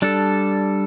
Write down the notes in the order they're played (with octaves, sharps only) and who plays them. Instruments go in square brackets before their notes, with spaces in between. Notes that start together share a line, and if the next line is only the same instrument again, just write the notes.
[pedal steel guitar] G3 D4 A4